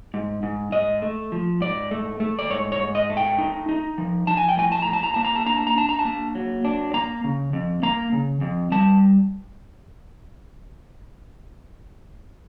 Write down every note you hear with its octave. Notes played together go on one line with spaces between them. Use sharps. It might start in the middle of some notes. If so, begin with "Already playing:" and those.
G#2
G#2
G#2 D#5
A3
F3
G#2 D5
A3
A3
D5
G#2 C#5
C#5
G#2
D#5
A3
G5
D#4
D#4
F3
F3 A5
G#5
G5
A2 G#5
A5
A#5
A2
A5
A#5
A#3 A5
A#5
A5
D4 A#5
A5
A#5
D4 A5
A#5
A5
A#3
F#3
D4
A#3 A#5
C#3
F2
A#3 A#5
C#3
F2
G3 A5